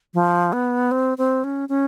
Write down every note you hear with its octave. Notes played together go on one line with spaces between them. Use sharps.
F3
B3
C4
C4
C#4
C#4